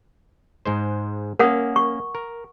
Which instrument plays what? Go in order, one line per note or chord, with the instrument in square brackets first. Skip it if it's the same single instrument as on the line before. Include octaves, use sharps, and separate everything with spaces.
[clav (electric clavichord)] G#2 G#3 C5
[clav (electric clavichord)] A#3 C#4 [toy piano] A#4 F#5 D#6
[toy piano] C#6
[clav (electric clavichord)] A#4